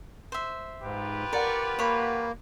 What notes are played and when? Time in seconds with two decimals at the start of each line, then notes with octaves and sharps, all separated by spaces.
0.32 C5 E5
0.83 G#2 F4 G4 B4
1.33 A#4 D5 F#5 C#6
1.79 A#3 C#5 B5